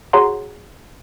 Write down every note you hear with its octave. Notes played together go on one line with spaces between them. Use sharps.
F#4 G#4 C#5 F#5 A#5 C6